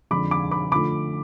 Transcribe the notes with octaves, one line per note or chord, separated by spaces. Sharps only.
F2 D3 G#3 D4 B5 D6
B5 D6
B5 D6
D3 F3 A3 B5 D6